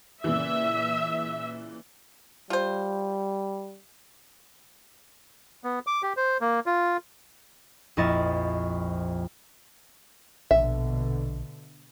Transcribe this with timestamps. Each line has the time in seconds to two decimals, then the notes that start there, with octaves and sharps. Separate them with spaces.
0.24 A#2 C#3 E3 E5
2.50 G3 F4 C5
5.64 B3
5.87 D6
6.03 G4
6.17 C5
6.41 A#3
6.66 F4
7.97 A#1 F2 E4 D#5 C#6 A6
10.51 A#1 B2 D3 E5